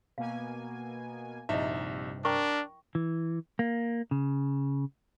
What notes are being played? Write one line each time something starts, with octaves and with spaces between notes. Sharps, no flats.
B2 A#3 F5 G#5
A#1 G2 C3 D#4 E4 D#5 E5
D4 A#4 G5 A#5 C#6
E3
A#3
C#3